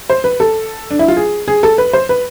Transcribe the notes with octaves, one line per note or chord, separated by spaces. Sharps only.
C5
B4
A4
D4
E4
F4
G#4
G#4
A4
B4
C5
B4